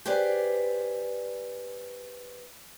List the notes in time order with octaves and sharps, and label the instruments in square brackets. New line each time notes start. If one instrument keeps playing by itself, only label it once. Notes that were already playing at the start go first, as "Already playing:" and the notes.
[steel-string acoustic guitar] G4 G#4 B4 C5 D5